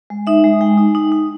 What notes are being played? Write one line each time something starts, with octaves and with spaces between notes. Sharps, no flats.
G#3
D#4 E5
G#3
G#3 G5
D#4
D#4
D#4